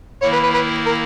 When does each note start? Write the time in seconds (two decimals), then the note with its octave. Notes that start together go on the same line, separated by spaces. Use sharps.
0.22 D#3 A#3 E4 C#5
0.33 B4
0.43 B4
0.54 B4
0.86 A#4